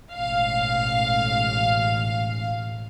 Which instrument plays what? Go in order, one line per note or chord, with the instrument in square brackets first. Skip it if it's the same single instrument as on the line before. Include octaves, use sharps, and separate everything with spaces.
[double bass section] A1 G#2 B2 [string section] F5